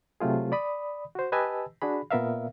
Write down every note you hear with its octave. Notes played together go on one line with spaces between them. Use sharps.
C3 F#3 A3 F4 G#4
D5 B5 D#6
F#4 C5
G4 B4 D#5 G#5 A5 E6
D4 F#4 G#4 B5
A#2 B3 A#4 E5 F5